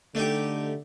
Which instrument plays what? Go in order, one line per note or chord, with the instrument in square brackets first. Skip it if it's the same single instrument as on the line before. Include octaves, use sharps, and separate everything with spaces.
[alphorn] D3 [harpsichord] A3 D#4 G4